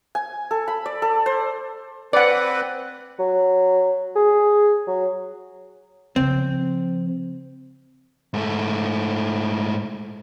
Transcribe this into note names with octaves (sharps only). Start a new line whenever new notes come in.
G#5
A4
B5
D5
A4
C5
C4 B4 D5 F#5
F#3
G#4
F#3
C#3 F3 C4
G#2 A3